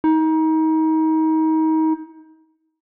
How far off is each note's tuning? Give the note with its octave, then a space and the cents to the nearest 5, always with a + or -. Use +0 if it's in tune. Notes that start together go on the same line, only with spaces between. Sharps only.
D#4 +30